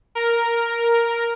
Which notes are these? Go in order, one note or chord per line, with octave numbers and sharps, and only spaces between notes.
A#4